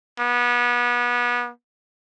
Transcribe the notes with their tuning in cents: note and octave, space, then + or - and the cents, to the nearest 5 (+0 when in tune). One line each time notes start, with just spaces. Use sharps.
B3 -30